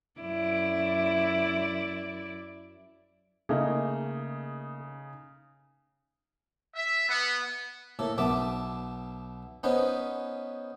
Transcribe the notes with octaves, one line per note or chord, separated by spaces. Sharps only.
F#2 E4 D5
C#3 A3 A#3 D#4 G#4
E5
B3
A2 A#3 A4
B1 B3 E5 A5 D6
B3 C#4 D#4 B4 C5